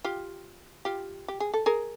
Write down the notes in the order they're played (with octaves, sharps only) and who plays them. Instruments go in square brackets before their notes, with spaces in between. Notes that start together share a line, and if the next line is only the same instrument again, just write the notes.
[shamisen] F4 G4
F4 G4
G4
G#4
A4
G#4 A#4